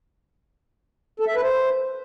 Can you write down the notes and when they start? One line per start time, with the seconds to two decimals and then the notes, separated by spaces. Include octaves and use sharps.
1.20 A4
1.27 E5
1.35 B4
1.43 C5